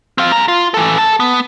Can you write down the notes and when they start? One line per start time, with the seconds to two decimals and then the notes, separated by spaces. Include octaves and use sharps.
0.18 C4 F5
0.32 G#4 A#5
0.48 F4
0.74 E3 A4
0.98 A4 A5
1.20 B3